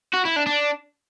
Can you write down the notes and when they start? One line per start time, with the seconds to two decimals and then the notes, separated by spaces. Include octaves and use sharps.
0.13 F#4
0.25 E4
0.36 D4
0.46 D4